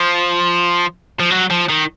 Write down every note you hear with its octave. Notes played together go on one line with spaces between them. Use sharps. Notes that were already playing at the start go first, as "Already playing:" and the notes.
Already playing: F3
F3
F#3
F3
D#3